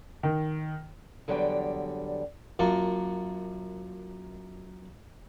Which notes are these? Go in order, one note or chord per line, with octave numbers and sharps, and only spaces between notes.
D#3
E2 D3 F#3 G3 D5 G5
F#2 A#3 F4 A#4 F#5 A5